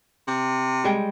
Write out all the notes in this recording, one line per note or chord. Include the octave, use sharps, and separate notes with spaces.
C3
G3 G#3 G5